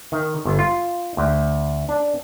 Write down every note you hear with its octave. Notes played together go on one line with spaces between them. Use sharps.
D#3
G1
F4
D2
D4